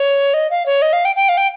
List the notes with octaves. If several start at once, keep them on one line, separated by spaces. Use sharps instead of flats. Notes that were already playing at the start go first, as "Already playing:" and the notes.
Already playing: C#5
D#5
F5
C#5
D#5
F5
G5
G5
F5
G5